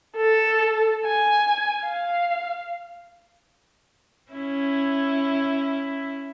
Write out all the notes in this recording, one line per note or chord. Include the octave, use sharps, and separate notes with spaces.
A4
G#5
F5
C#4 E4